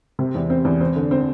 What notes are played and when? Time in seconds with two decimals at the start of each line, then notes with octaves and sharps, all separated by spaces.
0.19 C3
0.35 E2
0.50 C4
0.65 E2
0.81 C4
0.96 D3
1.11 C4